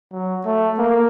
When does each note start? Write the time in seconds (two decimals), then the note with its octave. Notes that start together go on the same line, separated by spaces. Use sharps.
0.12 F#3
0.46 A3
0.78 A#3